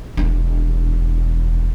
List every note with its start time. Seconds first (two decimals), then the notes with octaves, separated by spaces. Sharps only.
0.17 E1 D4